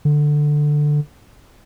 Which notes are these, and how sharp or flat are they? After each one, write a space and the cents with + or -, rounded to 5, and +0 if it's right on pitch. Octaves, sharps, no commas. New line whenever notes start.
D3 +10